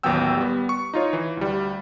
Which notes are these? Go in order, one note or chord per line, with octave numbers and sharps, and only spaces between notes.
A1 D#2 F#3 B3 G5 E6
G3 B3
C#6
D#4 F4 C#5
E3
D2 G3